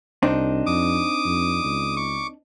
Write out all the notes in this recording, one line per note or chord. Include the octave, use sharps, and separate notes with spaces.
C2 C4 D4 D#4
F2 D6 D#6
F2
C#2
C#6 D6